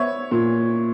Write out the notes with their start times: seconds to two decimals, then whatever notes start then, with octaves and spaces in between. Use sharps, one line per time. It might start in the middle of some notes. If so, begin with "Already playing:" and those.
Already playing: B3 C#5 E5
0.31 A#2